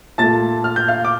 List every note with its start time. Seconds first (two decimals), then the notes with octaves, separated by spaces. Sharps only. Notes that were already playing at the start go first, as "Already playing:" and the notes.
0.18 A#2 A3 A5 A6
0.64 F6
0.76 G6
0.88 F5 F6
1.05 D6